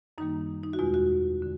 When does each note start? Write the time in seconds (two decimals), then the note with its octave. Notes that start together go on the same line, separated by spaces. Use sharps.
0.18 F#2 D#3 G3 A#3 D#4
0.63 D#4
0.73 F#4
0.79 E2 B2 G#3 F4
0.94 F#4
1.42 D3